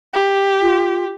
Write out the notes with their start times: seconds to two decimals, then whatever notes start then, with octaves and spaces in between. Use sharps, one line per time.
0.14 G4
0.62 F4